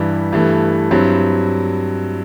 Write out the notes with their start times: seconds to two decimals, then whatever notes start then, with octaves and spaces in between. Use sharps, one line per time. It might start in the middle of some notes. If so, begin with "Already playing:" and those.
Already playing: G2 E3 G3
0.33 G2 E3 A3
0.91 G2 F#3 C4 E4